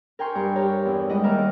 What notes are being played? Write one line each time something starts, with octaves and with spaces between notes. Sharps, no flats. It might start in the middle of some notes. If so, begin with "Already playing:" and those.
A#4 G5 G#5 C6 C#6
G2 A#4
G4 A#4 C#5
E2 E4
G3 G#3 E4 D#5 F#5
D#2 A#4 E5 D6 F6